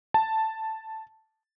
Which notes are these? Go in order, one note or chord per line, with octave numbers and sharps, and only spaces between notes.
A5